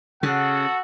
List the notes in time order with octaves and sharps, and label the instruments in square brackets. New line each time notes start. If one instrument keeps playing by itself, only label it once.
[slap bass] C#3 [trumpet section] F#4 A4 F#5